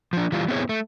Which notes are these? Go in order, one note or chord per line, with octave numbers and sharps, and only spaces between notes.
F3 D4
E3 G3 F4
B3 C4 E4 G#4 C#5
A3